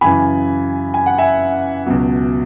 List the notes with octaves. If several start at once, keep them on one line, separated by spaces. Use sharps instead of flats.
F#2 C#3 E3 G#5 B5
G#5
F#5
E5 G#5
C#2 B2 F#3